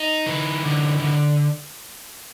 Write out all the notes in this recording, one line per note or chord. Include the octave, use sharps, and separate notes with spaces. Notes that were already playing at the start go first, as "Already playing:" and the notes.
Already playing: D#4
E3
D3
D3